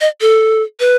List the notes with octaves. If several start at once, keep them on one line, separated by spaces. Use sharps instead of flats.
D#5
A4
B4